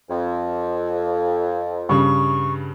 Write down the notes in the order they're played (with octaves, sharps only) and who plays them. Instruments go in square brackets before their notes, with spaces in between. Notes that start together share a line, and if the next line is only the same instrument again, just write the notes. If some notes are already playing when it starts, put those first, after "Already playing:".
[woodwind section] F2
[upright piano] G2 C#3 [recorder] C#6